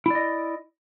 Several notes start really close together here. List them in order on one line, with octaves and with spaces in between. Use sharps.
E4 D5 D#5